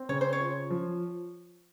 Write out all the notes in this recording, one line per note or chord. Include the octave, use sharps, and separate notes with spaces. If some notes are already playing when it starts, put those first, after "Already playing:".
Already playing: C4
C#3 C#5
C5
C#5
F4
F3